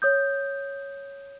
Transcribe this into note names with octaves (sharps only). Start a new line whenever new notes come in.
C#5 D#6 G6